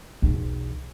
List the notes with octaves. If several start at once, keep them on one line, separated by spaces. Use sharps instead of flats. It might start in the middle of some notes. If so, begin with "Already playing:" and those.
B1 E2